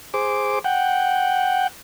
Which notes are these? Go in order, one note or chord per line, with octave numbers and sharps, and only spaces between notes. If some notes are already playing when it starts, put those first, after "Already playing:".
G#4 C5 D6
F#5 G5